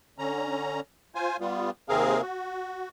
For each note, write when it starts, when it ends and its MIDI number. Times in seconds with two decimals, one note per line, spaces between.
0.18 0.80 50
0.18 0.80 61
0.18 0.80 82
1.15 1.37 65
1.15 1.37 72
1.15 1.37 80
1.40 1.70 55
1.40 1.70 59
1.40 1.70 65
1.89 2.21 39
1.89 2.21 48
1.89 2.21 60
1.89 2.21 68
1.89 2.21 70
1.89 2.21 77
2.22 2.89 66